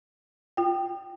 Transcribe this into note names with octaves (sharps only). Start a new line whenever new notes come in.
F4 G5